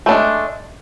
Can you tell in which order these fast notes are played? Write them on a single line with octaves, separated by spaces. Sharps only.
A3 D4 G#3